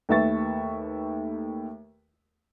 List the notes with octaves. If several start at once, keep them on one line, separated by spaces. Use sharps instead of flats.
D#2 A3 B4 E5 C#6 A6